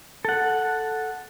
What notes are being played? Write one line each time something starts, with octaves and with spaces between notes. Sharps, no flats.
A4 F#5